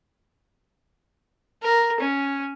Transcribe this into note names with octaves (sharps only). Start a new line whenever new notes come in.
A#4
C#4